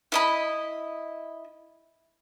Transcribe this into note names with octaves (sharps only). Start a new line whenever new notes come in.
E4 D#5 B5